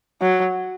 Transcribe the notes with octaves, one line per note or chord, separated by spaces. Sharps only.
F#3